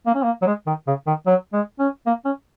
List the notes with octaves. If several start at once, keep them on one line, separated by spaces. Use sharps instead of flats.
A#3
C#4
A#3
F#3
G#3
D#3
C#3
D#3
F#3
G#3
C#4
A#3
C#4